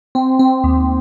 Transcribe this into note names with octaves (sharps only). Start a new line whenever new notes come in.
C4
C4
D#2